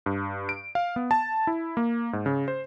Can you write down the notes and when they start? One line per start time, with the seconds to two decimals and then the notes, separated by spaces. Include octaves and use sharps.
0.06 G2
0.49 D7
0.75 F5
0.96 B3
1.11 A5
1.47 E4
1.77 A#3
2.13 G#2
2.26 C#3
2.48 C5